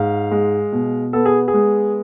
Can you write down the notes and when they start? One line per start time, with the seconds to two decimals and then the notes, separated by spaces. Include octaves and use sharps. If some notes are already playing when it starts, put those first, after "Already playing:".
Already playing: G#2 F5
0.31 G#3
0.72 B2
1.13 B3 A4
1.26 G#4
1.48 G#4
1.54 G#3